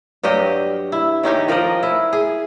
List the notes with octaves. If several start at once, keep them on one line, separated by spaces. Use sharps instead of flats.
G2 F#3 G4 D#5
E4
D#3 C#4 D#4 G4
F3 A#4 D5 D#5
E4
G#4